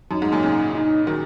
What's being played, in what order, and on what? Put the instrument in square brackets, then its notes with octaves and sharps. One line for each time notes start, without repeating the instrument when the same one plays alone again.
[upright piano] F#2 [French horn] D#4
[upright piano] G#2
F#2 A#2
A#2 C#3
[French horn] D#4
[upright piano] D#3 F#3